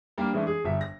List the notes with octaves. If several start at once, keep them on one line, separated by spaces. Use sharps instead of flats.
G3 A#3 D4 F5
E3 G#3 A3 C#4 D4
G#4
G1 E5
A#6